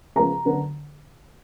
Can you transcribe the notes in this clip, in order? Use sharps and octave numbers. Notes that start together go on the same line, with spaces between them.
C#3 F3 G#3 B3 A#5
D3 F#3 B3